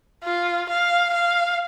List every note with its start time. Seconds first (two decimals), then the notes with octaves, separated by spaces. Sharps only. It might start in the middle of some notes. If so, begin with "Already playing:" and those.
0.24 F4
0.69 F5
1.13 F5